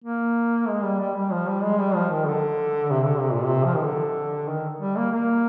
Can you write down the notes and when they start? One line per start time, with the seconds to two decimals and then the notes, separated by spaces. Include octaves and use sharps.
0.04 A#3
0.68 G#3
0.83 G3
1.00 G3
1.15 G3
1.31 F3
1.47 G3
1.63 G#3
1.78 G3
1.95 F3
2.10 D#3
2.26 D3
2.90 C3
3.05 D3
3.19 C3
3.31 A#2
3.46 C3
3.64 F3
3.75 D#3
3.85 D3
4.48 D#3
4.81 G3
4.96 A#3
5.12 A#3